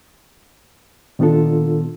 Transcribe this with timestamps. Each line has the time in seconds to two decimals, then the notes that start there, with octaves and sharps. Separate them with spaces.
1.19 A#2 D#3 B3 D4 F4 A4